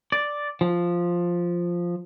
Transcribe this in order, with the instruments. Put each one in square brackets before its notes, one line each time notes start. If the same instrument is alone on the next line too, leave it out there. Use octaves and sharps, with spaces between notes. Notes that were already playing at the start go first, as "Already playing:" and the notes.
[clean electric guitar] D5
F3